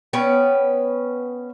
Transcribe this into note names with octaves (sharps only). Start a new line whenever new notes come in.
B3 C#4 B4 G5